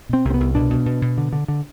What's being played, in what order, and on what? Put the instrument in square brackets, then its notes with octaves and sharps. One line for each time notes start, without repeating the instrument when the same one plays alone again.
[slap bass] B2 C4
C2
C4
B3
C2
B2 D4
B2
B2
B2
D3
D3
D3